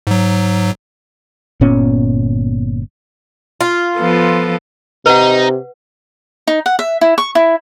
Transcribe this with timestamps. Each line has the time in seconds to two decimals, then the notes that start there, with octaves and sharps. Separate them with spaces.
0.07 G#2 F#3
1.61 G1 A#2 B3 C#4
3.61 F4
3.98 F3 B3 A4
5.06 C3 D#4 B4 F#5
6.47 D#4
6.66 F#5
6.79 E5
7.01 E4
7.18 C#6
7.35 E4